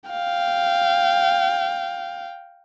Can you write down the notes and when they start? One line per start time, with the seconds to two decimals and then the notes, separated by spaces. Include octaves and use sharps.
0.10 F5 G5